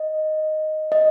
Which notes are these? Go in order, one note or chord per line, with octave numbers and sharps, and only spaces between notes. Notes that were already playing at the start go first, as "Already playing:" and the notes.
Already playing: D#5
D#5